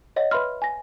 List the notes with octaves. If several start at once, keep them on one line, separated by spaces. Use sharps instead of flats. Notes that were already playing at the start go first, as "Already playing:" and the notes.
C#5 D#5 F#5
B4 E5 B5 C6 F6
G#5 A#6